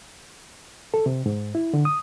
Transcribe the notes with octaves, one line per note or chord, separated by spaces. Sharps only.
A4
C3
G#2
E4
D3
D#6